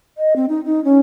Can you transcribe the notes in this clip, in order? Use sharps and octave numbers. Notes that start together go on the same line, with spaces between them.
D#5
C4
D#4
D#4
C#4